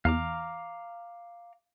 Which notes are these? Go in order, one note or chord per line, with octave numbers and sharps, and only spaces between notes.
E2 F5 A#5 D6